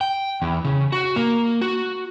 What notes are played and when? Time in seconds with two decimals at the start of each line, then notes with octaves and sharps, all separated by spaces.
0.01 G5
0.42 E2
0.65 C#3
0.92 F#4
1.16 A#3
1.62 F#4